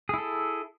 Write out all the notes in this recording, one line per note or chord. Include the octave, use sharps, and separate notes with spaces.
E4 G#4 A4